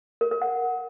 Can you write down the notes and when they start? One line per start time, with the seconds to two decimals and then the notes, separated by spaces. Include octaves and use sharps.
0.21 A#4
0.31 A#4
0.42 F#5